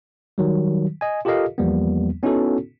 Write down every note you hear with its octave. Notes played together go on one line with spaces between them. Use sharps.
D#3 F#3 G3
D#5 G#5
F4 G4 A4 A#4 D#5 F5
E2 F3 G3 A#3 B3
B3 C#4 D#4 E4 F#4 A4